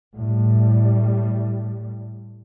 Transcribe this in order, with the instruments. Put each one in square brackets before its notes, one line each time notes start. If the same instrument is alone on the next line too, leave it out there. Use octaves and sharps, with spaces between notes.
[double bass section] A2 G3